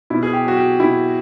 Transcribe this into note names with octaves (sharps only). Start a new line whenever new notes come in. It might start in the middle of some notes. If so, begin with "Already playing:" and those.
B2 E4
G#4
G4
F#3 F#4
G4
B2 E4